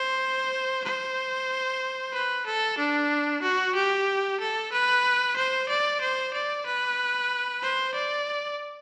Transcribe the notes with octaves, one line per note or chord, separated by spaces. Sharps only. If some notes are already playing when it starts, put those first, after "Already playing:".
Already playing: C5
C5
B4
A4
D4
F#4
G4
A4
B4
C5
D5
C5
D5
B4
C5
D5